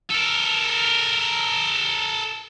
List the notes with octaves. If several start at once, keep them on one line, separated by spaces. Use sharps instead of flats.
A4 A#4